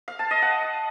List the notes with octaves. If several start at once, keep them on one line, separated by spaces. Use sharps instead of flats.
F5
A5
D#5
F#5